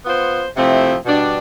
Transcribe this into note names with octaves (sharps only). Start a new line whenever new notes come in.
B3 F4 C5
C3 F3 A3 C4 E4
B2 G3 D4